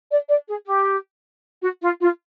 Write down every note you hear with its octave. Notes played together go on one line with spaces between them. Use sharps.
D5
D5
G#4
G4
F#4
F4
F4